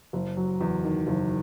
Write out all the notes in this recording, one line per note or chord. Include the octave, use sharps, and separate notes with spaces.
F#1
F#3
E2
D#3
F#1